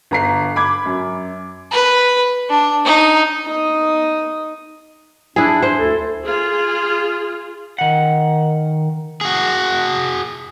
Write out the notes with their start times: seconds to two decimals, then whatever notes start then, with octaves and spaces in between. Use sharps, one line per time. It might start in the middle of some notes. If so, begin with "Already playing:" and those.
0.11 G1 A#5 C7
0.56 B5 D6 G#6
0.85 F#2
1.72 B4
2.50 D4
2.85 D#4
3.45 D#4 D#6
5.36 D4 E4 G#4
5.62 C5
5.78 D2 E4 A4
6.22 F4 G#4
7.79 D#3 F#5
9.21 F#4 G#4